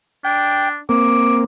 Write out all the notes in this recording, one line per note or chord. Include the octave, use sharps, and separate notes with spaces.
D4 G5
A#3 C4 D6